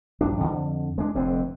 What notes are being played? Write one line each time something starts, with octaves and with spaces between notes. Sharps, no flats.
A#1 G2 D4
F2 D3
G#3 D4
F1 F2 D3 C4